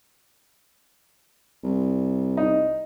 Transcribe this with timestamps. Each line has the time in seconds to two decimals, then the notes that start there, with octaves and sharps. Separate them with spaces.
1.64 C2
2.37 D#4